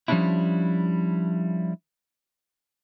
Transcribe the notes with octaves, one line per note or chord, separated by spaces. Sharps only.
F3 G3 A#3 C#4 D4 E4